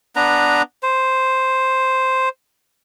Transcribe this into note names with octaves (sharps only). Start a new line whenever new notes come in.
B3 D4 B4 A#5
C5